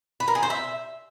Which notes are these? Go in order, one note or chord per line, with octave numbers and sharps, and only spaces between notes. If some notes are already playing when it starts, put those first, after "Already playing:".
B4
A#4
G#4
C5
E5